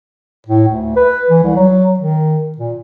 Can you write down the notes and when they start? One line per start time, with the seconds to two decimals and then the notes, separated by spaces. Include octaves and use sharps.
0.47 A2
0.68 D2
0.96 B4
1.30 E3
1.43 C2
1.56 F#3
2.00 D#3
2.58 A#2